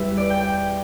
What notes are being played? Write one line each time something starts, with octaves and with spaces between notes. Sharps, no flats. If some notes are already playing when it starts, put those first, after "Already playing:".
Already playing: E2 E3 G3 G4 E5
D5
G5
G5